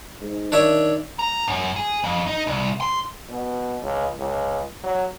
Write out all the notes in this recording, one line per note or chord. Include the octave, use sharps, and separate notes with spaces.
G#2
D#3 D4 C#5 E5
A#5
F#2
G#4
F2
D#4
C2
C6
B2
C#2
C#2
F#3